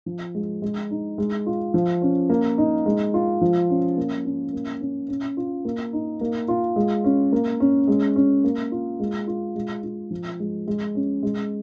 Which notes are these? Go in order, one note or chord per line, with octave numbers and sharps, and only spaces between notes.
F3
G#3
G#3
D#4
G#3
F4
F3
C#4
A#3
D#4
G#3
F4
F3
C#4
A#3
C#4
A#3
C#4
C#4
F4
A#3
D#4
A#3
F4
G#3
C#4
A#3
C#4
G#3
C#4
A#3
F4
G#3
F4
G#3
F4
F3
G#3
G#3
C#4
G#3